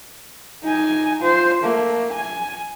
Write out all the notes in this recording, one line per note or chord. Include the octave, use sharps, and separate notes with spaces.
D#4 G#5
F4 C5
A3 A#3
G#5